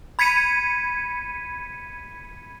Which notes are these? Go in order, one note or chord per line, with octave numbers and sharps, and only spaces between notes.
B5 G#6 B6 C#7 D#7